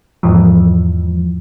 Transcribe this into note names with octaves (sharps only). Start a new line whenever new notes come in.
E2 G#2 E3 F3